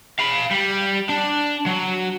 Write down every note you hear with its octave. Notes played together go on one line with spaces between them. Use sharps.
F5 B5
G3
D4
F#3